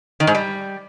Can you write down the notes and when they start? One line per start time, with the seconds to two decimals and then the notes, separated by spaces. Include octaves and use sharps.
0.20 D#3
0.27 G#2
0.35 G3